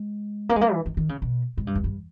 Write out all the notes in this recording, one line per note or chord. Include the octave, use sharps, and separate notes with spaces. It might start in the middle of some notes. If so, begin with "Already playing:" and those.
Already playing: G#3
A#3
G#3
A#3
E3
D#3
D#3
C#3
B2
G#2
G2
E2
G2